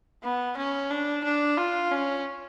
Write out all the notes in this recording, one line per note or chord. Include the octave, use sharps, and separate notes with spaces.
B3
C#4
D4
D4
F4
C#4